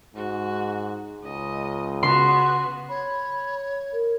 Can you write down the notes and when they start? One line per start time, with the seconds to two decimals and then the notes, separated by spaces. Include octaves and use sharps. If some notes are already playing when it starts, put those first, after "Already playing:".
0.16 G#2 F#4
1.23 C#2 D#5
2.03 C#3 B3 F#4 C6
2.89 C#5 B5
3.93 A#4